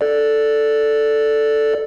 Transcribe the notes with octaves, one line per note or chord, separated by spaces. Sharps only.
A4 D5